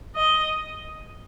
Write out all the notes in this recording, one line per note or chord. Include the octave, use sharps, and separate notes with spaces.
D#5